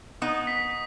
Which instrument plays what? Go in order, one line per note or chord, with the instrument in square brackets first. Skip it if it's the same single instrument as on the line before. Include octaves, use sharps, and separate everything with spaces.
[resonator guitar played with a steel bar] B3 D#4 [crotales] D#6
[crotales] B6